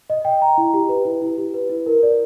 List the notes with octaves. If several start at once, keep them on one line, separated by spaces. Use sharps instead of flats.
D#5
G5
A#5
E4
G4
B4
E4
E4
G4
B4
E4
A#4
D5